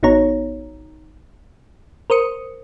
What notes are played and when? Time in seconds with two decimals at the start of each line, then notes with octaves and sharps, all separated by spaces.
0.03 A1 B3 D#4 F#4 C#5 A#5
2.10 A#4 C5 D#6 C#7